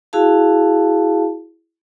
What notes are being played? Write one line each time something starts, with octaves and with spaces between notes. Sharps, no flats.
E4 F#4 G#4 F5 A5